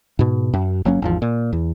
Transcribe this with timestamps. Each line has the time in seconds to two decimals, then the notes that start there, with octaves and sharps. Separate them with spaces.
0.19 G#2 B2
0.53 F#2
0.85 G1 F#3 A#3 C#4
1.02 G#1 E2 F3
1.22 A#2
1.53 E2